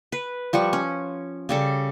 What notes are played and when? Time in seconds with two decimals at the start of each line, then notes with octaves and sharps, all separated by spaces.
0.12 B4
0.53 F3 G3 F#5 C#6
0.73 C#4
1.49 C#3 G3 A4